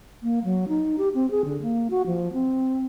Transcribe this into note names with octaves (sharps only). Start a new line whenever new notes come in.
A#3
F#3
D#4
G4
C4
G#4
D3
A#3
F#4
F3
C4